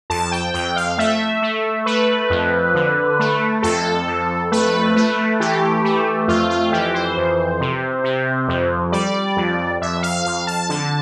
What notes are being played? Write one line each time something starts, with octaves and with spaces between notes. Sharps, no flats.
F2 A5
G5
F2 G5
F5
A3 E5
A3
A3 B4
F2
D3
A3
F2 A4
F2
A3 B4
A3
E3 G4
A3
F2 F4
F4
E3 G4
C5
F2
C3
C3
F2
G3 D5
F2
F2 E5
F5
F2 F5
A5
D3 A5